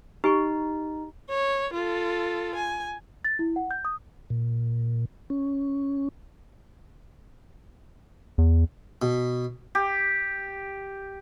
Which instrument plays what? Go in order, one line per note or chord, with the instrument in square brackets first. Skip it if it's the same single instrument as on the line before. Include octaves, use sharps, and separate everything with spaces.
[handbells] D#4 [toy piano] G4 G#5 C#6
[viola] C#5
F4 A4
G#5
[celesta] A6
E4
F#5
G6
D#6
[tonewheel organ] A#2
C#4
[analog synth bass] E2
[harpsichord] B2
[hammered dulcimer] G4